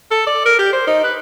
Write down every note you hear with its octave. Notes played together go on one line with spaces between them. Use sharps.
A4
D5
A#4
G4
C5
D#4
B4